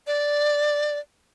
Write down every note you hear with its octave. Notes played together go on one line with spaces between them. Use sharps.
D5